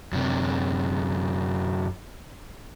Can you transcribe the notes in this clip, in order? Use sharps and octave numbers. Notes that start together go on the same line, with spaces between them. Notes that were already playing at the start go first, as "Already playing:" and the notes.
F#2 C3